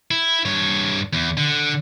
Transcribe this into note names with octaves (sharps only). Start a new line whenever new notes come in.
E4
G2 C#5
E2
D3